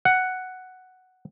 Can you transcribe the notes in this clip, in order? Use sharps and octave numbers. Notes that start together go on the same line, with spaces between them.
F#5